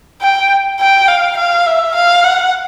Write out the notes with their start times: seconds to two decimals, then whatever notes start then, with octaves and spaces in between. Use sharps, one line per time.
0.21 G5
0.80 G5
1.08 F5
1.37 F5
1.66 E5
1.94 F5
2.23 F#5